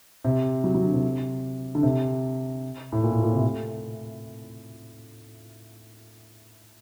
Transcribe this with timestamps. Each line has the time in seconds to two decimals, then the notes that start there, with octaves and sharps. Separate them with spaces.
0.24 C3
0.64 F#3
0.74 F#3
0.83 D3
0.93 C3
1.75 D3
1.83 C3
2.92 A2
3.03 A#2
3.13 A2
3.23 A#2
3.33 C3
3.42 A3